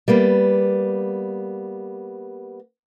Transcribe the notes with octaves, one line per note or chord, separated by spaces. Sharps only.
G3 A#3 B3